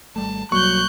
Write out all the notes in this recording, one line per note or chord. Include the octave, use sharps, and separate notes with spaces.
G#1 G3 A3 A5
B1 F#3 G3 A#3 C#6 F#6 G6